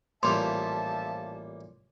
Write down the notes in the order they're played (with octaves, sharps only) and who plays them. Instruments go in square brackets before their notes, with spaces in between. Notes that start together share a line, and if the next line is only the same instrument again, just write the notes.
[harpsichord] A1 A#2 G3 [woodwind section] F3 E5 A5 [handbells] C6